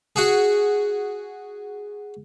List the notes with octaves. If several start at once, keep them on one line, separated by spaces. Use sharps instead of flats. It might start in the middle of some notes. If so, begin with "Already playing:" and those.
F#4 G#4